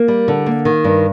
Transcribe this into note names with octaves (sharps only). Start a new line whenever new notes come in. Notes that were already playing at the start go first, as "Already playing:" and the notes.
Already playing: A#3 A#4
G3
D3
A#3
D#3
G2